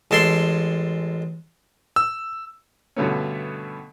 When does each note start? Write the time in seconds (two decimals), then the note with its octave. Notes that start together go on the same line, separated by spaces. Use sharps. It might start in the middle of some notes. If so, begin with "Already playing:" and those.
0.11 A1 G#3 A4 G5 C6
1.96 E6
2.97 G2 B2 D3 A3 B3 C#4